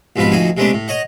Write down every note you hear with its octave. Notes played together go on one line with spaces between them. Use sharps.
C2 G#2 B2 F3 F4 B4
D2 F3 D#4 F#4 G#5
C3 G#3 A3 B3 C#4 D4
A2
C#5 D#5 F#5